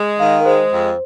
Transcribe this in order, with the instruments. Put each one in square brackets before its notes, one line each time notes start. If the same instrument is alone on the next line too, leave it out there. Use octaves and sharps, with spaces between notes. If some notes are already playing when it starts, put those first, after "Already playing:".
Already playing: [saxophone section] G#3
[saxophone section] D#3 [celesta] F5
[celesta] A#4
[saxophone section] G#3 [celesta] C5
[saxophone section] F2